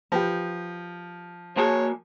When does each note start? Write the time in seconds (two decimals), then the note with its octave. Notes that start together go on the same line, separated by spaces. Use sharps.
0.12 F3 G4 B4
1.57 A#3 F#4 G#4 C#5 G#5 A5